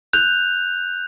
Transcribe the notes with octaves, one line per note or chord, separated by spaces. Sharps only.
F#6 G6 F7